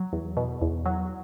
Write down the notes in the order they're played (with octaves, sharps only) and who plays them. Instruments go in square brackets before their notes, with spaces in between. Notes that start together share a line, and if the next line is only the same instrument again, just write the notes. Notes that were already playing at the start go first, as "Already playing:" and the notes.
Already playing: [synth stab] F#3
E2
B2
E2
F#3